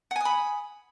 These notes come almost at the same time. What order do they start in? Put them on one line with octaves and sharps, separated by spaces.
F#5 G#5 D#6 B5